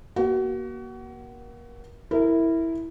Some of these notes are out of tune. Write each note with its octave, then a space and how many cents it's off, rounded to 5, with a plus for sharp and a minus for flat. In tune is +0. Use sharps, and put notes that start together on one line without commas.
A#3 +30 F#4 +30
E4 -5 A#4 -25